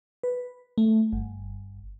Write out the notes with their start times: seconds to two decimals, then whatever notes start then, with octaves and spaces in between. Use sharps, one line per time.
0.23 B4
0.78 A3
1.13 G1